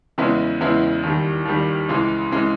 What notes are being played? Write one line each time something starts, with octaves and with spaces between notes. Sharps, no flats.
E2 C#3 G#3 B3 E4
E2 C#3 G#3 B3 E4
D#2 D#3 G3
D#2 D#3 G3
C#2 C#3 E3 G#3
C#3 E3 G#3